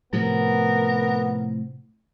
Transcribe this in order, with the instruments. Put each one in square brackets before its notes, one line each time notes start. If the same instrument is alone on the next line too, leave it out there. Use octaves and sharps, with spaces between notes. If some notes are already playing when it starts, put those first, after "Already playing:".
[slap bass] A2 C3 F3 [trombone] B3 [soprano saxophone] A#4